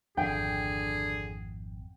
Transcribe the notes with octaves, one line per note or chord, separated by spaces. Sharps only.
G#1 F2 D3 G#4 G5